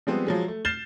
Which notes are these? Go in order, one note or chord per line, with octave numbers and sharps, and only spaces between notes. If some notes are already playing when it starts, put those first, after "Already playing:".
F3 G3 G#3 B3 C4
F3 F#3 G#3
A3
F6 G6 A6 C7 E7 G7